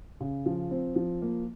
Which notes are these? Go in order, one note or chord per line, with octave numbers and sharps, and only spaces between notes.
C#3
F3
C4
F3
A#3